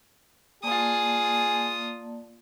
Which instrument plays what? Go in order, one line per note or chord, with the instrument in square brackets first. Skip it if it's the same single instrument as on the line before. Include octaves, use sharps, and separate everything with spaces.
[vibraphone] A#3 D5 A5 [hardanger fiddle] F4 D#6 [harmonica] G#4